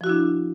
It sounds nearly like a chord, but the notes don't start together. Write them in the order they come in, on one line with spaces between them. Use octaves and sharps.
F3 F#4 E4 D4